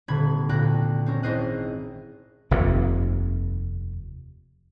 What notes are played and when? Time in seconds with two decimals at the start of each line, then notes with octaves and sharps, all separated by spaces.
0.08 D#1 D3 C4 B5 G#6
0.49 D2 A#2 G5 F#6 A#6
1.06 C4 C#4 A#4
1.23 G#1 E4 A#4 C5 D#5 F#6
2.51 F1 D#2 C3